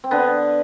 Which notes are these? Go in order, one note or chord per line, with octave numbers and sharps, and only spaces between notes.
C4
D3 B3